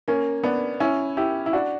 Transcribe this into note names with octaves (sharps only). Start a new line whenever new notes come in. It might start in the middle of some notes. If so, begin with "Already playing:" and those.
A#3 C#4
B3 D4
C#4 E4
E4 G4
E4
D4 F#4